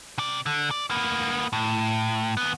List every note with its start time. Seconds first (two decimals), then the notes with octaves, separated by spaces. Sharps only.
0.18 C3 D5
0.46 D3
0.71 D5
0.90 A#3 B3
1.53 A2
2.37 D#2 B3